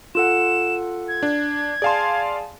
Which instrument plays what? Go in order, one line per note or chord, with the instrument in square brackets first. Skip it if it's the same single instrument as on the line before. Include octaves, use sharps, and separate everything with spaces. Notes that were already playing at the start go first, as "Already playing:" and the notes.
[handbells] F4 A4 F#5 [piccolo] E7
[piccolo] G#6
[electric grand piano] D4
[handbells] G#4 G#5 A5 [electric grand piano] D5 F5 C6